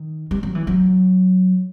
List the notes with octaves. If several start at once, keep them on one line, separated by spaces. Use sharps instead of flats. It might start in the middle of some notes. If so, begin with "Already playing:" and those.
Already playing: D#3
G3
F#3
E3
F#3